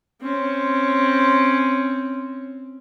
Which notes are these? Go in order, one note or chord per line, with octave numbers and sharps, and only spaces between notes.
C4 C#4